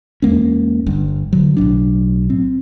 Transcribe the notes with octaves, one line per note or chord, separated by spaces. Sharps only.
E2 G#3 A#3 C#4
G1 G2
D3 F#3
B1 A2 F#3 D4
C4